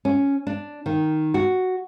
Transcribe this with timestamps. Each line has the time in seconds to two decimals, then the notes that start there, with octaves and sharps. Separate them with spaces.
0.05 C#4
0.47 D4
0.86 D#3
1.34 F#4